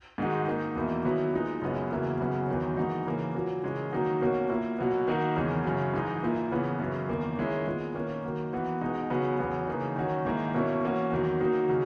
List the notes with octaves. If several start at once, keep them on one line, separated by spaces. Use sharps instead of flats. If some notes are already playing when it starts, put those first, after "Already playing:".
G#2 D#3 G#3 D#4 F#4
D#3 A#3 D#4
E2 B2 A#3 E4
D#3 F#3 B3 E4
A#2 G#3 D#4
F#2 C#3 G#3 B3
E2 C#3 F#3 A#3 E4
F#2 C#3 F#3 B3 F#4
E2 D#3 F#3
G#2 E3 A#3 D#4 F#4
C#3 E3 A#3
A#2 F#3 A#3
C#3 E3 G#3 C#4
D#3 F#3 A#3 D#4 F#4
B2 A#3 C#4 F#4
A#2 A#3 E4
B2 F#3 B3
D#3 A#3 D#4 F#4
E2 C#3 E3 G#3
F#2 C#3 F#3
G#2 E3 G#3 D#4
A#2 A#3 E4
C#3 E3 B3
F#2 C#3 E3
E2 D#3 A#3
D#3 G#3 C#4 E4
A#2 G#3 B3
D#3 A#3 C#4
D#3 F#3 A#3
E3 B3 F#4
B2 G#3 D#4 F#4
C#3 F#3 B3
E2 C#3 F#3 B3
C#3 E3 A#3 D#4
D#3 F#3 C#4 F#4
G#2 D#3 A#3 E4
B2 A#3 C#4 E4
E3 A#3 C#4 F#4
E2 D#3 F#3
D#3 F#3 A#3 D#4 F#4
C#3 F#3